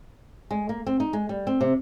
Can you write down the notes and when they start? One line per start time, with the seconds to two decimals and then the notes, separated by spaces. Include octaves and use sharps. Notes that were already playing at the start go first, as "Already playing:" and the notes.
0.51 G#3
0.69 A#3
0.87 C4
1.00 D#4
1.13 G#3
1.29 G3
1.47 C4
1.61 C3